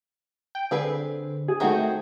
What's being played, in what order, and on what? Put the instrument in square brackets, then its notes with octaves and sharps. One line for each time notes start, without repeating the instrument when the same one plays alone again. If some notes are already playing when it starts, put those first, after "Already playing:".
[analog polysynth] G5
[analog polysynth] D3 [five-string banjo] C4 G#4 B4
[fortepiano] G#4
[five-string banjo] D#3 C4 F#4 [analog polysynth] A3 G5